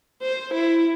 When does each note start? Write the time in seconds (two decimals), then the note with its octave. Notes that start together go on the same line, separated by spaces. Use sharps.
0.22 C5
0.54 E4